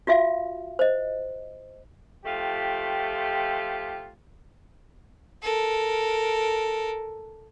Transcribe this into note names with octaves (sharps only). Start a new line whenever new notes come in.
F4 F#4 E5 F5
C5 D#5
F3 A3 F4 G4 G5
A4 A#4